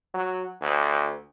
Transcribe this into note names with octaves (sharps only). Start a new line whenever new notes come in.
F#3
D2